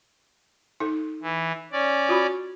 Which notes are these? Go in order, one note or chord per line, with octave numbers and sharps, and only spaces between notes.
D#4 A4
E3
C#4 D5
F4 F#4 B5